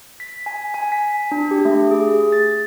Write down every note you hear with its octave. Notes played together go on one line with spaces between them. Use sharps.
B6
G#5
G#5
B6
D4
G4
A3
G#4
A6